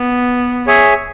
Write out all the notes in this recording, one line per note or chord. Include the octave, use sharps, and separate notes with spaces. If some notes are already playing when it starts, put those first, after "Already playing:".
Already playing: B3
G#4 C#5 E5 G#5